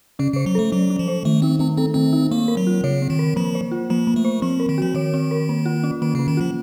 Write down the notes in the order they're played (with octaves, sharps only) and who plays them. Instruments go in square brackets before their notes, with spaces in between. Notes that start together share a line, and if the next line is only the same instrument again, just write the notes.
[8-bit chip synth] C#3 [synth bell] C#4
[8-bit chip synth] C#3 [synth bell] C5
[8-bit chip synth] F#3
[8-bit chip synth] A3 [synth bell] A4
[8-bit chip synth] F#3 [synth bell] C#4
[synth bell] C#4
[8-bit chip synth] F3
[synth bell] C5
[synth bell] D#3 [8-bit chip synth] A3
[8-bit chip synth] C4 [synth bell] D#4
[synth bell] A3 [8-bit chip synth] C4
[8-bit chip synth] C4 [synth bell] A4
[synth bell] D#3 [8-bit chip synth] C4
[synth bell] D#4
[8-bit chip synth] A#3 [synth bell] C4
[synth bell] A#4
[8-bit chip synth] F#3
[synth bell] F4
[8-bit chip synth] C#3 [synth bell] C#5
[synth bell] C4
[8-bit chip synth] D#3
[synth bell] A#4
[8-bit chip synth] F3 [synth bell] A#3
[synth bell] C5
F4
[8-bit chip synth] F3 [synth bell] A#3
[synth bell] A#3
[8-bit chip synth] A3
[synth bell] C5
[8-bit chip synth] F3 [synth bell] C4
[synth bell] A#4
[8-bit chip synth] D#3
[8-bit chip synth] F3 [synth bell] F#4
[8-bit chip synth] D#3 [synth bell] C#5
[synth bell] C4
A#4
A#3
F4
C#4
[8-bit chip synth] D#3 [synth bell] A#3
[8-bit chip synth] C#3 [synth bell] A#3
[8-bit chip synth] D#3
[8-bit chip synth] F3 [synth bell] F4